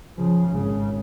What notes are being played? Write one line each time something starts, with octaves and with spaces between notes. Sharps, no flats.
C#3 F3
G#1 C#3